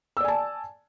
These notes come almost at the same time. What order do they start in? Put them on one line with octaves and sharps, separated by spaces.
E6 D5 G#5 A5